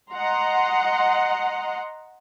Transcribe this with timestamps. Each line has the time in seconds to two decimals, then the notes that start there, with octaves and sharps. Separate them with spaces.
0.11 D#5 F#5 A#5 C6